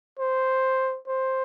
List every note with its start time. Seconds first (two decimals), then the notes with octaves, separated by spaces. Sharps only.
0.19 C5
1.08 C5